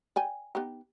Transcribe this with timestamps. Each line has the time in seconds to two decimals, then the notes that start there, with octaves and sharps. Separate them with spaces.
0.16 D5 G5 G#5
0.55 B3 D#4 G4